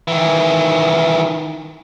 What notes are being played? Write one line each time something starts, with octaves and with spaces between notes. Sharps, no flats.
D#3 E3